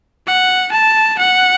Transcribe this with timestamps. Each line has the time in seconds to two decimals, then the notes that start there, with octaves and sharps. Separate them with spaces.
0.27 F#5
0.72 A5
1.19 F#5